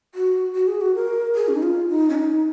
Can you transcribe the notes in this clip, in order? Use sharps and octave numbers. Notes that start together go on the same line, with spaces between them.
F#4
F#4
G#4
F#4
A#4
G#4
C#4
D#4
F4
D#4
C#4
D#4